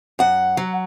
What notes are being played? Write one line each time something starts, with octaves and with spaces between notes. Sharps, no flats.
F#2 F#5
F#3